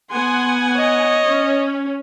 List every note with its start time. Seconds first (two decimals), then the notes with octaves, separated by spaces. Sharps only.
0.11 B3 F#5 G#5 C6
0.74 C#5 D#5
1.27 C#4